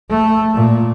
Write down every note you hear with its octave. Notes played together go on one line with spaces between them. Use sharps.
A3
A#2